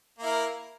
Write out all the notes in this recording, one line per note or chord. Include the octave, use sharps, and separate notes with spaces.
A#3 E4 A#4